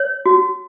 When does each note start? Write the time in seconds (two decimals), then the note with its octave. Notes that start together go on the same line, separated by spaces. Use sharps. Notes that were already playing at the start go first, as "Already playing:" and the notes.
Already playing: C#5
0.26 F#4